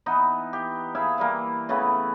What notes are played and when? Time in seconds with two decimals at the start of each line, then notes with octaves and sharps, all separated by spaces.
0.06 E3 B3 D#4
0.53 G4
0.95 E4 G#4 E5 F5
1.18 E3 G3 A#3
1.69 C#3 E3 A3 B3